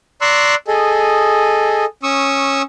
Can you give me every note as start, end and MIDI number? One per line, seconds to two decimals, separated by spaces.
0.21 0.55 74
0.21 0.55 82
0.21 0.55 84
0.21 0.55 85
0.21 0.55 88
0.21 0.55 90
0.68 1.85 68
0.68 1.85 69
0.68 1.85 75
2.03 2.62 61
2.03 2.62 85
2.03 2.62 87
2.03 2.62 88